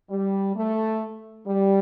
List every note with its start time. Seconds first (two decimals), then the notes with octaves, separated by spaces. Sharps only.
0.10 G3
0.56 A3
1.46 G3